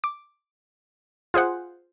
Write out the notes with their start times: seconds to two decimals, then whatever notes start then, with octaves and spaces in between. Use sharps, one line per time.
0.04 D6
1.34 F4 G#4 C5 F#5